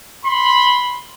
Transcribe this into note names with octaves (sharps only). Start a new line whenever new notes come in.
B5 C6